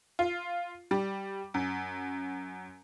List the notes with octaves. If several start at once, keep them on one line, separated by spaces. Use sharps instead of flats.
F4
G3
F#2